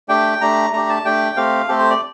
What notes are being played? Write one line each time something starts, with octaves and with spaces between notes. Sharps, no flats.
A3 D4 G4 G5
A3 D4 G4 A#5
A3 D4 G4 A#5
A5
A3 D4 G4 G5
A3 C4 G4 F5
A3 C4 G4 A4
C5
D5